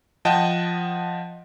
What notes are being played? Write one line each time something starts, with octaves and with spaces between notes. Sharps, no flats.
F3 D#5 F#5 G5 A5